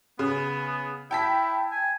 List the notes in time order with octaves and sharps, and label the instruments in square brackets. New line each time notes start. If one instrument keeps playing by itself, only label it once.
[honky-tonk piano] C#3 [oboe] B3
[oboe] E4 [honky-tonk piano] G5 A5 B6
[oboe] G#5